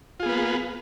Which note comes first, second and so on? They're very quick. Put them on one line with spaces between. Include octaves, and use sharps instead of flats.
F4 G#4 B3 B4 A#3